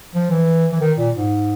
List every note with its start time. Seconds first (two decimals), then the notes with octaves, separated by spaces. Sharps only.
0.15 F3
0.30 E3
0.72 E3
0.81 D#3
0.98 A#2
1.15 G#2